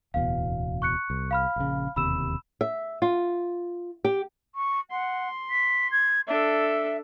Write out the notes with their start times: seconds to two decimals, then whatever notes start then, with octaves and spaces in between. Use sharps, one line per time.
0.14 D1 E2 B2 F5
0.82 C#6 F#6 C#7
1.10 C2
1.31 F5 B5 F6
1.56 A#1 C#3
1.96 E1 D#2 C3 B5 E6 E7
2.61 E5
3.02 F4
4.04 G4
4.55 C#6
4.91 F#5 C6
5.50 B6
5.92 G#6
6.27 D4 A4 E5